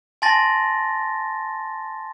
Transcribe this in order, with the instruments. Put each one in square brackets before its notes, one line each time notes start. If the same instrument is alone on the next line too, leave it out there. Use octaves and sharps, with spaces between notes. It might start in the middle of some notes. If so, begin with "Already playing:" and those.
[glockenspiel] G#5 A5 C6 A6 A#6